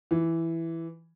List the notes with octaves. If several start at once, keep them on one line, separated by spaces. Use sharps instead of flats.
E3